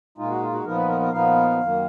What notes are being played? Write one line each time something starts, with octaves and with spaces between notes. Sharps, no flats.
A#2 G#3 D#4 F4
F#4
F4
F#4
A#2 F3 B3 D#4 A#4
B4
A#4
A#4
A#2 F3 B3 D#4 F5
F#2 D#3 A#3